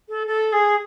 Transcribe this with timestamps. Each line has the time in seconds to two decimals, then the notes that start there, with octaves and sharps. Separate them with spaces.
0.09 A4
0.27 A4
0.52 G#4